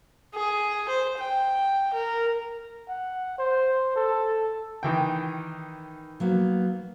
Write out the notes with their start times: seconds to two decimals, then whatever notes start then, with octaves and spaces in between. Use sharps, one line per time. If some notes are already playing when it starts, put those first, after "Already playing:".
0.34 G#4
0.89 C5
1.18 G5
1.93 A#4
2.89 F#5
3.38 C5
3.96 A4
4.83 D#3 E3 G5
6.20 F#3 A#3 B3